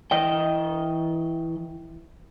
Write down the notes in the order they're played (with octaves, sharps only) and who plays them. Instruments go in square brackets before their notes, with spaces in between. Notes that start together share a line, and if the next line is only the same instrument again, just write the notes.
[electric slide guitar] E3 D#5 G5